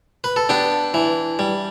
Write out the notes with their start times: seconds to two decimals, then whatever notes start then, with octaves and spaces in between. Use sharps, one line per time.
0.24 B4
0.36 A4
0.49 B3 D4 G4
0.94 E3
1.39 G3